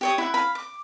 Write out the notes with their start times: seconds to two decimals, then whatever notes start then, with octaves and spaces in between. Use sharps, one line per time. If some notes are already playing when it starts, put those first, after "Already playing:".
0.01 G4 C#5 D#6
0.18 E4 F#5
0.34 F5 B5
0.55 D6